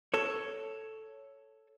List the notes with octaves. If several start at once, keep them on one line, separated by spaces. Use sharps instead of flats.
A4 C#5